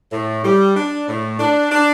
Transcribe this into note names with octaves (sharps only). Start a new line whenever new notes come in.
A2
G3
D4
A2
D4
D4